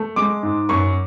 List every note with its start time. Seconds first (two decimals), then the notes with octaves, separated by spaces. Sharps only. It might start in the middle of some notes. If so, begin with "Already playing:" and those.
Already playing: A3
0.16 G#3 D6
0.43 G#2
0.69 F#2 C#6